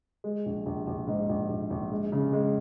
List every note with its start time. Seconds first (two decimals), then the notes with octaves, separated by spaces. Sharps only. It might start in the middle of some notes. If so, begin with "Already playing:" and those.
0.24 G#3
0.46 A#1
0.66 A#1
0.87 A#1
1.07 G#2
1.29 A#1
1.49 A#1
1.70 A#1
1.91 G#3
2.12 C#3
2.33 G#3